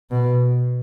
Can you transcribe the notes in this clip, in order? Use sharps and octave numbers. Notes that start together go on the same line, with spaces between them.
B2